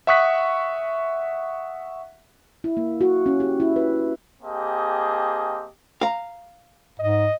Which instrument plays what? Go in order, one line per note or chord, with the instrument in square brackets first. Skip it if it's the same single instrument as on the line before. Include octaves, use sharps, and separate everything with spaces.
[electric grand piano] E5 F#5 C#6 D#6 F#6 B6
[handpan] E4
A#3
F#4
C#4
G4
E4
B4
[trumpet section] A#3 C4 G4 G#4 D#5 A5
[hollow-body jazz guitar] F5 A#5
[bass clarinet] G#2 [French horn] D#5